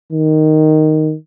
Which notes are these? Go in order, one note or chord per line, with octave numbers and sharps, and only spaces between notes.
D#3